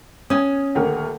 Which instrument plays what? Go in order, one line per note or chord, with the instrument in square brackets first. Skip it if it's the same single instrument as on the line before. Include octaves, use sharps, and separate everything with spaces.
[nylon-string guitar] C#4 [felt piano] D#6 G#6
[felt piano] D#1 D2 A#4